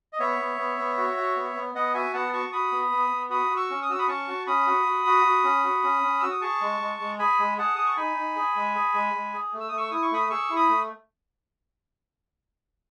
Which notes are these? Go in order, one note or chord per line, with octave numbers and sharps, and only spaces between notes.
D#5
B3 C#5 E5
B3
B3
B3
F#4
F#4
B3
B3
B3 D#5 F#5
F#4 E5 G#5
B3 F#5 A5
F#4 A5 C#6
F#4 B5 D#6
B3
B3
B3
F#4 B5 D#6
F#4
C#6 E6
C#4
D#6
F#4 E6
B5 D#6
C#4 A5 C#6
F#4
C#4 B5 D#6
F#4
F#4
F#4
F#4
C#4
F#4
C#4
C#4
F#4 E6
D#6
G#4 A5 C#6
G#3
G#3
G#3
G#4 G#5 B5
G#3
G#4 F#5 A5
G#4 D#6
C#6
D#4 G#5 B5
D#4
G#4
G#3
G#4
G#3
G#3
G#4
A3
E6
D#6
A3
C#6 E6
E4 D#6
C#6
A3 B5 D#6
G#4 C#6 E6
E4
B5 D#6
A3